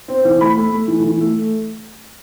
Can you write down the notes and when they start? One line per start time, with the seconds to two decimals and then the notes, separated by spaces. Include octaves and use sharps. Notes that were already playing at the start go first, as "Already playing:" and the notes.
0.08 C4
0.25 E3
0.41 A3 B5
0.57 A3
0.73 A3
0.88 E3
1.04 E3
1.21 A3